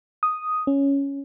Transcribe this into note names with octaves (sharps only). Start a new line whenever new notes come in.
D#6
C#4